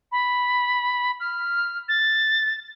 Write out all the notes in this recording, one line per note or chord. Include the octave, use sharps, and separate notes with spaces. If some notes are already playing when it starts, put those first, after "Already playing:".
B5
F6
A6